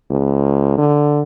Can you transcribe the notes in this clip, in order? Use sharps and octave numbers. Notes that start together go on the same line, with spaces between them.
C#2
D3